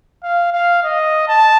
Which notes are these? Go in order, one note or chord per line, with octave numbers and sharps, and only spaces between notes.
F5
F5
D#5
A5